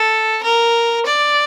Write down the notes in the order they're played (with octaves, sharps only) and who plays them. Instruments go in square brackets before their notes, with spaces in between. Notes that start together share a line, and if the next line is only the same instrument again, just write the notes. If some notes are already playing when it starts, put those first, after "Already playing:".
Already playing: [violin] A4
A#4
D5